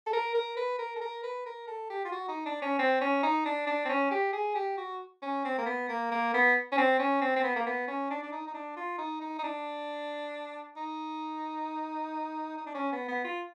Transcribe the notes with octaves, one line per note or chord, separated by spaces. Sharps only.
A4
A#4
A#4
B4
A#4
A4
A#4
B4
A#4
A4
G4
F4
F#4
D#4
D4
C#4
C4
C#4
D#4
D4
D4
C4
C#4
G4
G#4
G4
F#4
C#4
C4
A#3
B3
A#3
A#3
B3
C#4
C4
C#4
C4
C4
B3
A#3
B3
C#4
D4
D4
D#4
D#4
D4
F4
D#4
D#4
D#4
D4
D#4
D#4
D4
C#4
B3
B3
F4